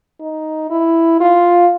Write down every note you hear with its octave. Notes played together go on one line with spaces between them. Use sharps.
D#4
E4
F4